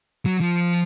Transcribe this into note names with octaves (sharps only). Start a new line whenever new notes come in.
F#3
F3